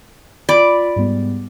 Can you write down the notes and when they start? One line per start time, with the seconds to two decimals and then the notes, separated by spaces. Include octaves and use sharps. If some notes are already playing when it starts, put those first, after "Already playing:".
0.49 F4 D5 B5
0.96 G#2 G3 B3